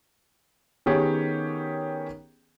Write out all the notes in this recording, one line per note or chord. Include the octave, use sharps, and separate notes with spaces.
D#3 B3 C#4 G4 G#4 C#5